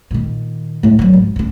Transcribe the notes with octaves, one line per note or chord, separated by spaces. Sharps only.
A#2 D#3
A2 C#3
F3 F#3
G#1
D3 C#4